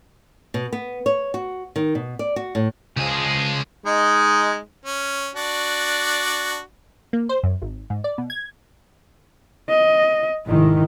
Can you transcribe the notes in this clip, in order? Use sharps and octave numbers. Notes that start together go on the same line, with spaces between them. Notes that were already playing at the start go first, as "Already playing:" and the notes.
B2
B3
C#5
F#4
D#3
B2
D5
F#4
A2
C#2 F3 G#3 F4 G#4
G#3 D#4
C#4
D4 F#4 D5
A#3
C5
F#2
G#1
G#2
D5
B2
G#6
D#5
F1 G#2 D#3 E4